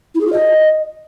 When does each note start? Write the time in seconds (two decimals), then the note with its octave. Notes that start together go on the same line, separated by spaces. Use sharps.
0.14 E4
0.20 G#4
0.26 F4
0.32 D#5